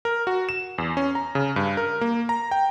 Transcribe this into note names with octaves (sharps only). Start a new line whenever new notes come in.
A#4
F#4
E7
E2
C#4
A#5
C#3
G2
A#4
A#3
A#5
G5